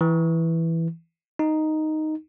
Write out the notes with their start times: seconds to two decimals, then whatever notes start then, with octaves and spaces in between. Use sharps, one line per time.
0.01 E3
1.39 D#4